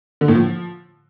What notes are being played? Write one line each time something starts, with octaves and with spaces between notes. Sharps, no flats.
D3
A2
F3